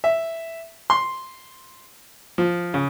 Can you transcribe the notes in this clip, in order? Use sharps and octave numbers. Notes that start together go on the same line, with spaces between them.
E5
C6
F3
C#3